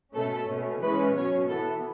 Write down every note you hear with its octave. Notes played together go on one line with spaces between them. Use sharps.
B2 A3 C#4 A4
B2 A3 C#4
E3 G#3 C#4 B4
B2 F#3 C#4 C#5
E3 B3 A4